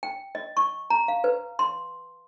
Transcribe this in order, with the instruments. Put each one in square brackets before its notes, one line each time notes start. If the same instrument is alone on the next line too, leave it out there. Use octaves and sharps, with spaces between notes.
[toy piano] G5
D#5
C#6
A#5
F5
B4
C6